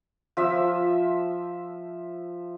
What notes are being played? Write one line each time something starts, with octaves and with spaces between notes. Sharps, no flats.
F3 E5 E6